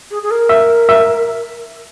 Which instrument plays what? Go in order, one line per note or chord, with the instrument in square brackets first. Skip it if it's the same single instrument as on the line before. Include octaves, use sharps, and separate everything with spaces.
[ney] G#4
G#4
A#4
[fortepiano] E5
E5